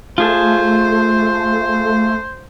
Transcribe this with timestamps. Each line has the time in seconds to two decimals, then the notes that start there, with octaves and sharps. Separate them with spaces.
0.18 A3 F4 G#4 C5 A5